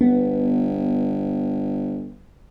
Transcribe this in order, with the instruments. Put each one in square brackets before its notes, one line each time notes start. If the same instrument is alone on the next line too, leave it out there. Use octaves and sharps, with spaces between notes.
[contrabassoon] G1 [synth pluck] B3